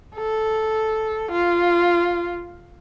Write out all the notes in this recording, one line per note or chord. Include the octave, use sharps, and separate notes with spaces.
A4
F4